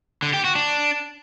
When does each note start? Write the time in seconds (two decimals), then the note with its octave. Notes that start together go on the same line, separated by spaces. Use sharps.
0.23 D3
0.33 G4
0.44 F#4
0.55 D4